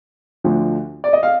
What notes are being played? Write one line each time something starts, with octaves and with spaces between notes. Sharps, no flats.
D2 D3 F3
D5
D#5
F5